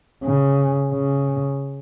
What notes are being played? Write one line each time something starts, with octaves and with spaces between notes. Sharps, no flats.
C#3
C#3